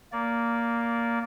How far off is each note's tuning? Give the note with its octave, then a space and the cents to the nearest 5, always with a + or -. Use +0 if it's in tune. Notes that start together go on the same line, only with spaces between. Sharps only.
A#3 +0 D5 -20